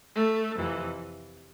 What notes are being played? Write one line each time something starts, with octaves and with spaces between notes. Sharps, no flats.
A3
F2 C3 E3